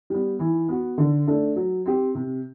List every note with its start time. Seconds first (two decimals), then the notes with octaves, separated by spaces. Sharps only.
0.10 G3 B3
0.39 E3
0.68 B3 F#4
0.98 D3
1.27 A3 D4 A4
1.56 F#3
1.86 C4 G4
2.15 C3